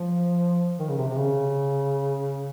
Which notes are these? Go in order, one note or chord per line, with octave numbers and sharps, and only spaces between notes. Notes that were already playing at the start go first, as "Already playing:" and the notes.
Already playing: F3
D#3
C#3
C3
C3
C#3